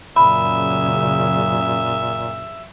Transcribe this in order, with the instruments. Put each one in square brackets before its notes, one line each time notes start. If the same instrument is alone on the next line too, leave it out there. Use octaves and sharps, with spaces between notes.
[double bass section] F#2 C#3 [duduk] A#2 [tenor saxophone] E5 [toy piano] B5